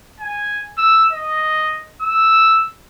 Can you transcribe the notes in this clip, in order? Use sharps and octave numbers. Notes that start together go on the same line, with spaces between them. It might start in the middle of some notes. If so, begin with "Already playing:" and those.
G#5
E6
D#5
E6